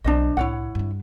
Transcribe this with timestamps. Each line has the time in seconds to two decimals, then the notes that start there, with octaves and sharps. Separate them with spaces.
0.04 B1 B3 D4 C5 D#5
0.37 C2 A2 E4 C#5 F#5
0.75 G2 D4